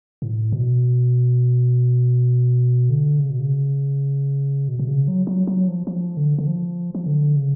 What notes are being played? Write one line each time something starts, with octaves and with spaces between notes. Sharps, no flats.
A2
B2
D3
C#3
B2
C#3
B2
B2
C#3
F#3
F#3
F#3
F3
F3
D3
D3
F3
F3
D3
C#3